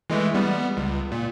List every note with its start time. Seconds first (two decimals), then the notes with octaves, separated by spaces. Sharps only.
0.10 E3 G#3 A3
0.35 G3 B3
0.77 C#2
1.12 A#2